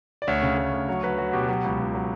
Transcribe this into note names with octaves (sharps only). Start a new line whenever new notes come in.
D5
D2 C#5
C#3
D2
D2
F#3 C#5
F#3 B4
F#3 F#4
B2 G4
F#3 G4
C#2
C#2
F#3